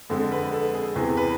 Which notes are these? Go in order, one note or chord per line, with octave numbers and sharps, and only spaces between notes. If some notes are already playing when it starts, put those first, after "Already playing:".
F2 D3 G#3 A4
B4
A4
G#4
E2 C3 E3 G#4
B4